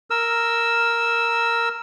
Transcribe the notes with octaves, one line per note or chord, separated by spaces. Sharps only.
A#4 E6